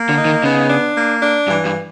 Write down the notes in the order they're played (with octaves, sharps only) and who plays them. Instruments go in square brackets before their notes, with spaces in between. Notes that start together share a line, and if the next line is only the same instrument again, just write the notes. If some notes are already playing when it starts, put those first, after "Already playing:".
Already playing: [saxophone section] A#3
[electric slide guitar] D3
[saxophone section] D#4
[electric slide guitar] D#3
[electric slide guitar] C#3 [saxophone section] B3
[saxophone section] D4
A#3
D4
[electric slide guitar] G2 [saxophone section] E3
[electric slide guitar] G2